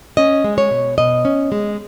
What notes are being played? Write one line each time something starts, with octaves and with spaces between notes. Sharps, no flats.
C#4 D#5
G#3
C#5
B2
B2 D#5
C#4
G#3